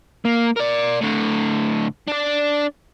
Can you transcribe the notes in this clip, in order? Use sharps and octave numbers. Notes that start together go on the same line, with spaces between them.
A#3
A#4 D5
A2 D3
D4 D5